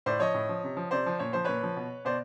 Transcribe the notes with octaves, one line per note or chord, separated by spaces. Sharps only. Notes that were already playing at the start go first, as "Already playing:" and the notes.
A2 C5 D5
F3 C#5 D#5
A2
F3
C3
F3
C3 C5 D5
F3
A#2 C#5
F3 C5
A#2 B4 C#5
F3
B2
B2 C5 D5